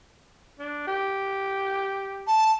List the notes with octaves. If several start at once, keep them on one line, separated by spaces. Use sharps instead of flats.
D4
G4
A5